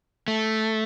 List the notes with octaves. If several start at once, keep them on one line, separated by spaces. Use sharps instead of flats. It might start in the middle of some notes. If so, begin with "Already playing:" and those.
A3